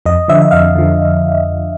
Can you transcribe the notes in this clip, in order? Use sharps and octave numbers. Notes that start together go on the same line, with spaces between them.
F2 D#5
D3 F3 E5
E5
F2 F5
D3 F3